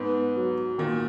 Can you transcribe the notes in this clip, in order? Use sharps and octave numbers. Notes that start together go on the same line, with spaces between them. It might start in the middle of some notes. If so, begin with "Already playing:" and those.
Already playing: G#2 B3
F#3
A#2 D#3